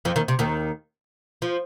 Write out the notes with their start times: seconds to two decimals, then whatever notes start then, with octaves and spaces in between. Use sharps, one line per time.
0.05 F2 F3
0.16 D#2 D#3
0.28 C3
0.39 D#2 D#3
1.42 F3